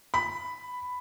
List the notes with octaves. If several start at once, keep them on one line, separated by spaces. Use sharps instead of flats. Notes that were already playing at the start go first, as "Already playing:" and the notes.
B5